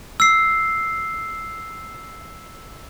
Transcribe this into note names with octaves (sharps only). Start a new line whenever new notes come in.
E6 C7